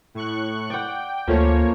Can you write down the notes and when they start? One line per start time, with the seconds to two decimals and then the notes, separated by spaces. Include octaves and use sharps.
0.15 A2 C#6 F#6
0.70 D5 F#5 G5
1.28 D2 F3 A3 A#3 C#4 C#5